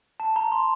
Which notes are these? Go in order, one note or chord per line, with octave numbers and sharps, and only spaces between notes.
A5
A#5
C6